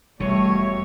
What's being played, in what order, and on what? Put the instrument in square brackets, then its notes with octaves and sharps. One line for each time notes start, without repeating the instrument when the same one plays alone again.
[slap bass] E1 B2 [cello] G3 [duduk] A3 [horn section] C#5